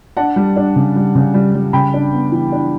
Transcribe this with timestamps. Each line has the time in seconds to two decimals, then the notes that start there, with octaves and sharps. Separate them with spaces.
0.17 D4 F#5 A5
0.36 G3
0.56 D4
0.76 C#3
0.96 G3
1.15 C#3
1.34 G3
1.55 G3
1.73 C#3 G5 B5
1.94 D4
2.13 B3
2.32 E3
2.52 D4